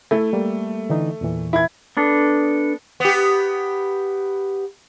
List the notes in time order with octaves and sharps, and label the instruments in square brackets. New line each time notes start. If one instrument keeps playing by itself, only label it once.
[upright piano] A3 [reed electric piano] E4
[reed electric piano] G3 A#3
D3 E3 D#4
E2 A#2 E3
[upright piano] E4 G#6
[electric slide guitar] B3 D4 A4
[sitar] B3 G4